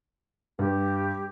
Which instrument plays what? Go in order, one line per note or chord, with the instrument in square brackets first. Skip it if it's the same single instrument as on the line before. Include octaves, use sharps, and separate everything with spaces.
[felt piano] G2 [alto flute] G4